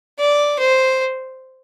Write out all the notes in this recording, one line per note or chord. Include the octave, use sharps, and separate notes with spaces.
D5
C5